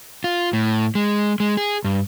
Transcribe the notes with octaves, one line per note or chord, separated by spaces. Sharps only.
F4
A2
G#3
G#3
G#4
G2